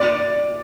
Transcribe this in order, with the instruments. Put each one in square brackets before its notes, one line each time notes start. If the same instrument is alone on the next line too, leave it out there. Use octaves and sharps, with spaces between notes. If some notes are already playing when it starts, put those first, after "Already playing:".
Already playing: [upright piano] D5